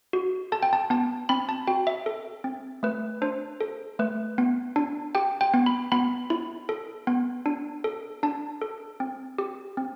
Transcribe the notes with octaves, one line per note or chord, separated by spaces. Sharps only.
F#4
A4 A5
G5
A5
B3 A5
C4 B5
A5
F#4 G5
E5
A4
C4
A3 B4
D4 C5
A4
A3 B4
B3
D4
G4 G5
G5
B3
B5
B3 B5
E4
A4
B3
D4
A4
D4 A5
A4
C4
G4
C4